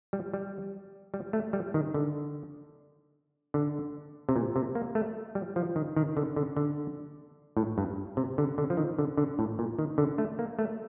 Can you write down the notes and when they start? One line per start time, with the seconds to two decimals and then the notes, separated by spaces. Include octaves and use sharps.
0.13 G3
0.34 G3
1.14 G3
1.33 A3
1.53 G3
1.74 D#3
1.94 D3
3.54 D3
4.29 C3
4.36 A#2
4.56 C3
4.75 A#3
4.95 A3
5.35 G3
5.56 F3
5.76 D#3
5.96 D#3
6.17 D3
6.36 D3
6.57 D3
7.57 A2
7.78 G2
8.17 C3
8.38 D3
8.58 D3
8.70 F3
8.77 D#3
8.99 D3
9.17 D3
9.39 A2
9.59 A#2
9.79 D#3
9.98 D3
10.18 A3
10.39 A#3
10.59 A3